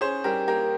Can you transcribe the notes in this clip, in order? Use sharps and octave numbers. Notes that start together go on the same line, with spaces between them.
C#4 G#4 C5
G3 G4 A#4
A#3 G4 A#4